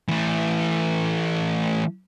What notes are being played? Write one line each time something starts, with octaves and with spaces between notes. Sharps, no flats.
E3 A3